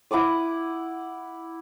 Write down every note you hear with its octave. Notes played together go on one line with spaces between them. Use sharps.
E4 F#5 D6 D#6